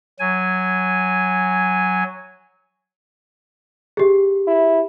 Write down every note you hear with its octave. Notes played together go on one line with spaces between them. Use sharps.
F#3 G#5
G4 G#4
E4